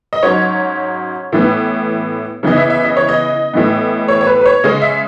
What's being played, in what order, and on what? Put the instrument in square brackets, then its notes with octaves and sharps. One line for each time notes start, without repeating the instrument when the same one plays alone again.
[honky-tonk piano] D#5
G#2 F#3 C#4 C#5
A2 E3 B3
C#3 E3 B3 D#5
E5
E5
D#5
C#5
D#5
A2 E3 B3
C#5
C#5
B4
B4
C#5
C#3 G#3 C#4 D#5
E5